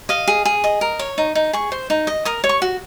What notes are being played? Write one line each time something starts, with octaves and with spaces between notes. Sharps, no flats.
D#5 F5
G#4
G#4
D#5
A#4
C#5
D#4
D#4
G#4 C#6
C5
D#4
D#5
A#4 D#6
C#5
C#6
F#4